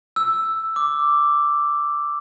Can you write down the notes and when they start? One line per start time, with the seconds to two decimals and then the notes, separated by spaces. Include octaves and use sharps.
0.16 E6
0.76 D6